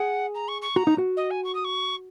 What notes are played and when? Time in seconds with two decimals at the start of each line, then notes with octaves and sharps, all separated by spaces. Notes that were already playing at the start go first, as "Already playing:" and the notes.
Already playing: G#4 F#5
0.34 A#5
0.48 C#6
0.62 C#6
0.76 F#4 A#5
0.87 D#4
0.98 F#4
1.16 D#5
1.30 G#5
1.44 C#6
1.54 D#6
1.64 C#6